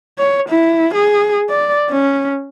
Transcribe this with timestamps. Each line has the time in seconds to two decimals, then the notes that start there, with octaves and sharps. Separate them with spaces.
0.19 C#5
0.49 E4
0.94 G#4
1.50 D5
1.89 C#4